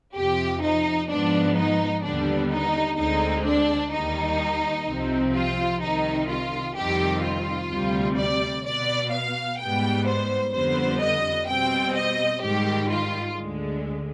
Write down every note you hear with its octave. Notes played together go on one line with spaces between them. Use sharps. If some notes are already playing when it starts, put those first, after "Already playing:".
F2 C3 F3 G4
D#4
G#2 F3 B3 D4
D#4
D#2 D3 G3 B3 D4
D#4
D2 D3 G#3 C4 D#4
D4
D#2 D#3 G3 D#4
C2 C3 F3 C4
F4
C2 C3 D#3 D#4
F4
F2 C3 D#3 G3 C4 G4
F4
D2 C3 G3
D5
B2 B3 D5
F5
G#2 G3 B3 G5
C5
F2 D3 G3 B3 C5
D#5
B2 G3 C4 G5
D#5
G#2 D#3 G3 G4
F4
D2 D3 G#3